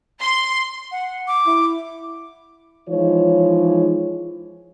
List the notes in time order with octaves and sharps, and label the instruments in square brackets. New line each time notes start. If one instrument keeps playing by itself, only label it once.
[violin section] C6
[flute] F#5
D6
[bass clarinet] E4
[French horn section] E3 F3 G#3 D#4 F4 C#5